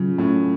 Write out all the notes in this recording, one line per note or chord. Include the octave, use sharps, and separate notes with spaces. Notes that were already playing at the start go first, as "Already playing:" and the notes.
Already playing: C#3 F#3 F4
A2 C#4